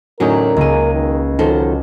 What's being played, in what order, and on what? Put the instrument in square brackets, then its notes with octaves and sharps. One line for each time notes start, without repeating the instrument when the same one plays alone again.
[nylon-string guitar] E2 A2 D3 [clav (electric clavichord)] F#3 C#4 D#4 [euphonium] A#4
[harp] C#2 D#7 [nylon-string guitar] A#3 G#4
[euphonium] D#3
[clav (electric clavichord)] D#3 [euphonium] F#3 [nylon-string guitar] F4 A4 C5